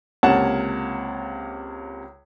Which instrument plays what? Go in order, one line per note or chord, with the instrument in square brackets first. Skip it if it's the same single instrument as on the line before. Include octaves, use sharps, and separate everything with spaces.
[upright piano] C#2 C3 A#3 C#5 F#5 A5